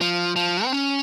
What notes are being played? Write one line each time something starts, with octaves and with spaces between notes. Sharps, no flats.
F3
F3
C4
C#4